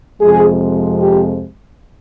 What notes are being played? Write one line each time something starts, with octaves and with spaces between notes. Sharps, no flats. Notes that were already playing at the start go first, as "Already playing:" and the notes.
F2 C3 F3 G#3 G#4
G4